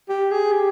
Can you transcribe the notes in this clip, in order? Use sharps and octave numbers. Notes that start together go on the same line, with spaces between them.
G4
G#4
G4